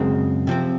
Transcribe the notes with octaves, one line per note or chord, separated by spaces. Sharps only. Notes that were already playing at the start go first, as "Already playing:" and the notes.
Already playing: F#2 C#3 G#3 C4 A#4
C3 F3 C4